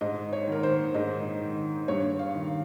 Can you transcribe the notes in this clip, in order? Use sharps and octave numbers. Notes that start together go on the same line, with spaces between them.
G#2 D#5
C#5
D#3 A#4
C5
G#2 D#5
D#3
G2 C#5
F5
D#3